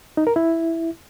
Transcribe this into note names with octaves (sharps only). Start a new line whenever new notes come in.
D#4
A#4
E4